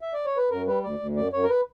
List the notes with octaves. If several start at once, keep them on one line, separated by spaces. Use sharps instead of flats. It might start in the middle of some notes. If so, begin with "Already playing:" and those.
E5
D5
C#5
B4
F#2 A#4
G3 B4
D2 D5
D2
F#2 D5
F#2 C#5
A#4
B4